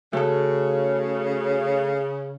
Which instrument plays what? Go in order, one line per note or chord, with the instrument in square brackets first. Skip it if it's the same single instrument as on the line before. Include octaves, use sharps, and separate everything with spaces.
[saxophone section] C#3 [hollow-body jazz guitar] A3 A4 [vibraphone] F#4